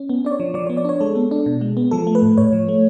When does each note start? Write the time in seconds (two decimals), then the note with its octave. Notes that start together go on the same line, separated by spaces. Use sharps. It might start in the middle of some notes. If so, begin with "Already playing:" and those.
Already playing: C#4
0.09 B3
0.25 D4 D5
0.31 C#5
0.40 F3
0.54 F3 D5
0.67 B3 C#5
0.77 D5
0.85 D4 C#5
1.01 G#3 A4
1.15 B3
1.31 D4
1.46 B2
1.61 G#3
1.77 B3
1.91 F3 A4
2.07 A3
2.15 B4
2.22 A2
2.37 A2 C#5
2.53 F3
2.68 A3